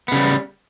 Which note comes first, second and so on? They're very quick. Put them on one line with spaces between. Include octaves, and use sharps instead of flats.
B3 C#3 G3